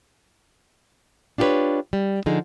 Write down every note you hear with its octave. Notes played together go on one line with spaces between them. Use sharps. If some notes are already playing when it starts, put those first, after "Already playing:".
D4 F4 G4 G#4 B4 C#5
G3
D3 F3 D#4 G#4